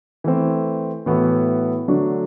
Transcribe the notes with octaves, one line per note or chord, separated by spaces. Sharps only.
E3 A3 C4
A2 E3 B3 F#4 A4
D3 F#3 A3 D4 F#4